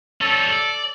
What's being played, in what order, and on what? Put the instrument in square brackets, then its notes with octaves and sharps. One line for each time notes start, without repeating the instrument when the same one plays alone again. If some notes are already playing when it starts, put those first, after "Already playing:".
[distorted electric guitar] G3 C#4 [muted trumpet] A4
[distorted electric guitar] D5